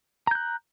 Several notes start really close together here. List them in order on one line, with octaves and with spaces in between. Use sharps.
A#5 G6 F#6